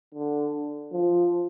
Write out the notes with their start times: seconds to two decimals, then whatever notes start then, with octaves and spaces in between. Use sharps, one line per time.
0.14 D3
0.92 F3